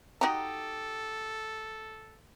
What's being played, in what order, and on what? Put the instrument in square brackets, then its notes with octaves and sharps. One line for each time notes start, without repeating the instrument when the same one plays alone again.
[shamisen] D#4 F#4 A#5 [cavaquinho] G4 D#5 [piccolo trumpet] A4